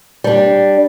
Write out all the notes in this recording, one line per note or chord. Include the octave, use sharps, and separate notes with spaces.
G3 D4